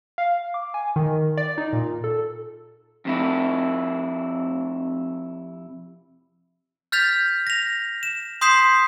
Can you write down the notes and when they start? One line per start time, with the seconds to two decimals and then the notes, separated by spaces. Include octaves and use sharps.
0.18 F5
0.54 D6
0.74 G#5
0.96 D#3
1.37 D5
1.58 D#4
1.73 A#2
2.04 A4
3.05 F2 C3 E4
6.92 F6 G6 A6 B6 F7
7.47 A#6 F7
8.03 E7
8.41 C6 D#6 G6 B6 C7 E7